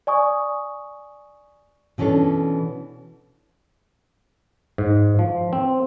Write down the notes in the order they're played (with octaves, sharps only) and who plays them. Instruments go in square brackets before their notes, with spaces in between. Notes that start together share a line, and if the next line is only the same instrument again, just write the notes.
[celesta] D5 G#5 C#6 D#6
[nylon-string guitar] B2 E3 C#4 D4 A4
[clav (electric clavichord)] G#2
F3
C4